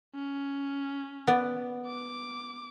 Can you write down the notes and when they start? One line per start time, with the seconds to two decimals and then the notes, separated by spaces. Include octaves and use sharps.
0.15 C#4
1.27 B3 D5
1.87 D6